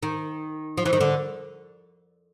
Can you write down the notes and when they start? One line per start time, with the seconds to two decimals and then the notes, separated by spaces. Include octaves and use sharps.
0.03 D#3
0.78 F3
0.85 E3
0.93 D#3
1.00 D3